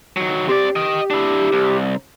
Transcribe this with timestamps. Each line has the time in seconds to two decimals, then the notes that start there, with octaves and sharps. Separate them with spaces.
0.17 D#3 F#3
0.49 C4 G4 D5
0.76 D#5 G5
1.11 D4 E4
1.53 C2